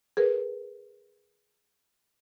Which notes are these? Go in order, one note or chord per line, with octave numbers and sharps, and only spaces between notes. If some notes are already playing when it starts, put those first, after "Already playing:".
G#4 A#4 B4